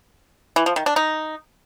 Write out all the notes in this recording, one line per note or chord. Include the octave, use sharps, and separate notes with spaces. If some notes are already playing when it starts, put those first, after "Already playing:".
E3
F3
D#3
D4
D#4